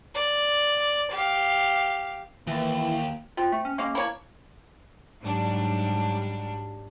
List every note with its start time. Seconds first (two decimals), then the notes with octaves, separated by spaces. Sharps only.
0.15 D5
1.12 G4 F5
2.47 D#2 E3 A#3
3.37 C4 F4
3.52 A3
3.65 C#4
3.78 G#3 A#3 C#4
3.95 A#3 D4 E4 C#5
5.20 G#2 F#3 G3 D4